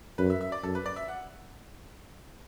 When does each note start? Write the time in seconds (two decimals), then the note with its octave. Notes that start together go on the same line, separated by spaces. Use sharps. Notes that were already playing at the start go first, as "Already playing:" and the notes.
0.18 F#2 B4
0.30 E5
0.41 E5
0.52 D5
0.63 F#2 A4
0.75 B4
0.86 D5
0.96 E5
1.08 F#5